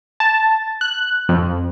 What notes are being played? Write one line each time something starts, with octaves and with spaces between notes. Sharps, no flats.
A5
F#6
F2